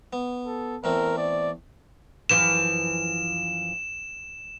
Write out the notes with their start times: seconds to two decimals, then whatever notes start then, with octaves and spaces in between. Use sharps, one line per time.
0.13 B3
0.46 A4
0.84 E2 A3 C4 A#4
1.18 D5
2.29 F#2 E3 F3 E7